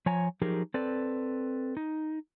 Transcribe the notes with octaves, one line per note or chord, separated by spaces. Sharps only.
F3 C#5 G#5 A#5
F3 F#3 D#4 G4 G#4 A#4
C4 A4 B4 D5
D#4